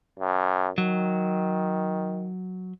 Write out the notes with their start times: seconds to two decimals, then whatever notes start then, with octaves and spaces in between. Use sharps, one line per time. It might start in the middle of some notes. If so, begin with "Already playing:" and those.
0.19 F#2
0.78 D#3 F#3